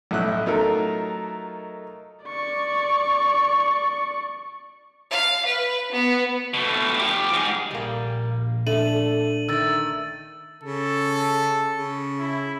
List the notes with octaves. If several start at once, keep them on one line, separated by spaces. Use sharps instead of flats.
B1 A2 E4 F#6
F#3 A3 D#4 F4 A4 A#4
D5 C#6
F5
B4
B3
B2 A3
F3 G4
G#2 G#4
A#1 G3 A#3
A3 D4 A4 E5 D#7 F#7
D#3 A3 E6 A6
C#3 A4
C#3
E4